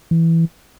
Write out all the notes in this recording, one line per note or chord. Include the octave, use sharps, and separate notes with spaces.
E3